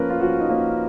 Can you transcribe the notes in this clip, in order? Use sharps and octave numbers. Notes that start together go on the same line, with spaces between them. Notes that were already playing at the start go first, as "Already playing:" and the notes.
Already playing: F3 A#3 C#4 A#4 B4
F4
F3 F#4
D#4
A#3 C#4